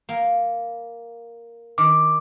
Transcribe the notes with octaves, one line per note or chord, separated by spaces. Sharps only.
A#3
D#3 D6